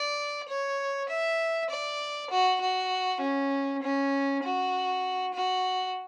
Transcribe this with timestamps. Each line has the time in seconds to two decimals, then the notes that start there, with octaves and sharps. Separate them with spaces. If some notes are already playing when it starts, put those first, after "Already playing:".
Already playing: D5
0.48 C#5
1.09 E5
1.70 D5
2.30 F#4
2.61 F#4
3.21 C#4
3.82 C#4
4.43 F#4
5.34 F#4